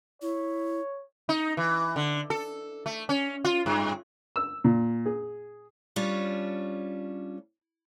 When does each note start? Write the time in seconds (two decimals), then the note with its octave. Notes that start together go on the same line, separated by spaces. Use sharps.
0.22 E4 C#5
1.29 D#4
1.57 E3
1.96 D3
2.30 A4
2.86 A3
3.09 C#4
3.45 F4
3.66 G2
4.36 E6
4.64 A#2
5.06 G#4
5.96 G3 C#4 D4 F4 C#5